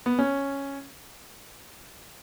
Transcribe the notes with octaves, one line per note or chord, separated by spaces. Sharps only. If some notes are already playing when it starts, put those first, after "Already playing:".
B3
C#4